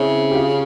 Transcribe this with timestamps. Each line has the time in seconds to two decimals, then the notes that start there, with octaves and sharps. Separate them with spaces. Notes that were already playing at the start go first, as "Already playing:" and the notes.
Already playing: C#3 C4 C#4 E4
0.31 G4
0.35 F4